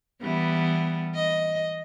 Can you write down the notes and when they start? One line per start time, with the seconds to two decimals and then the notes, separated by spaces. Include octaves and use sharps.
0.22 E3 G3 B3
1.15 D#5